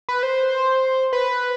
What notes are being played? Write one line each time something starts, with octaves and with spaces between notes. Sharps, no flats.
B4
C5
B4